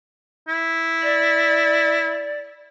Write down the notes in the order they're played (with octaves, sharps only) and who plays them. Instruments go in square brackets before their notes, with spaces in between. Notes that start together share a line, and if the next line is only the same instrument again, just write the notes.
[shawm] E4
[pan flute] D5